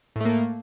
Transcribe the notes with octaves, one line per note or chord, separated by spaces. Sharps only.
A2 A3 A#3